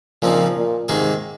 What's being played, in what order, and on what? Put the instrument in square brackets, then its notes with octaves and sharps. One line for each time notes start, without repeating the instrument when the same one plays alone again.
[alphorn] A#2 [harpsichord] C#3 F3 C4 D#4
[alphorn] A#2
[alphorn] G#2 [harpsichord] C3 D#3 A#3 D#4 G#4